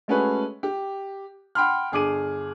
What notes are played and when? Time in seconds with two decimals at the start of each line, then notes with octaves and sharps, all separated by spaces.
0.08 G#3 A3 C#4 F#4 G#4 B4
0.63 G4
1.55 F#5 G5 B5 C6 F6
1.92 G1 G#4 D6 D#7